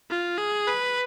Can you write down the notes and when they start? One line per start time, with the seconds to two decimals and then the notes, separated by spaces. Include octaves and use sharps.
0.10 F4
0.38 G#4
0.68 B4